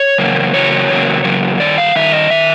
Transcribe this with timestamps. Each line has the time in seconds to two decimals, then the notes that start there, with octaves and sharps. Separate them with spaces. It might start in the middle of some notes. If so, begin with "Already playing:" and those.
Already playing: C#5
0.18 E2 C#3 F#3 A#3
0.54 E2 C#3 F#3 A#3 C#5
0.89 E2 C#3 F#3 A#3
1.24 E2 C#3 F#3 A#3
1.60 G2 D#3 D5
1.78 F5
1.95 G2 D#3 E5
2.12 D#5
2.30 D#3 E5